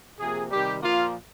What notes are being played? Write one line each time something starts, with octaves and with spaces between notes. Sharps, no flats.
C3 F3 A#3 G#4
C3 D#3 G3 G4
A#2 F3 A#3 F4